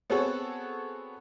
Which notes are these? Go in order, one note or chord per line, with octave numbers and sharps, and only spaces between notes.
B3 C4 F#4 G#4 A4 C#5